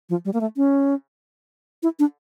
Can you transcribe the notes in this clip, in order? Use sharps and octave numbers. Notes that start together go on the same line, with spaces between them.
F3
G3
A#3
A3
C#4
E4
D4